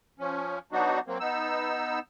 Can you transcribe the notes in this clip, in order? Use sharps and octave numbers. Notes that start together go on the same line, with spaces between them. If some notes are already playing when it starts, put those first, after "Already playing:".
F3 C#4
F#3 B3 D4 D#4 F#4
F#3 A#3 C4
B3 D#4 E6